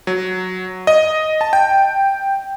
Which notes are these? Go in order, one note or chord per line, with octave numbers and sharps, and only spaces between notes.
F#3
D#5
A5
G5